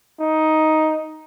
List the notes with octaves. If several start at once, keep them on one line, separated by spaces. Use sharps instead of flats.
D#4